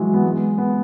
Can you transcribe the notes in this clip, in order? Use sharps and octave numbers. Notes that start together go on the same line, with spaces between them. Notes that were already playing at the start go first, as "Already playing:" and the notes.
Already playing: E3 F#3 G#3
B3
G#3
B3